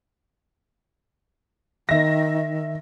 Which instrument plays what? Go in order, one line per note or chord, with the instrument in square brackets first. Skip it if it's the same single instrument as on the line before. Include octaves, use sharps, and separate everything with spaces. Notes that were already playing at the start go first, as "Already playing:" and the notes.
[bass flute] D#3 [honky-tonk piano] E5 A#6